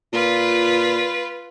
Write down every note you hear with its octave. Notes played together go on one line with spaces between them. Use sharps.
A#2 F4 B4